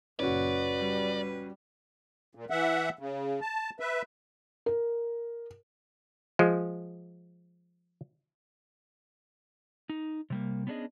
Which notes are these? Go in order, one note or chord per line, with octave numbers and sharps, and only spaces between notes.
F#1 A#2 C#4 F#4 B4 D5
G3
A#2
E3 E5 F#5
C#3
A5
B4 E5
A#4
F3 G#3
D#4
C3 G3 A#3
B3 C#4 D4 G#4 D#5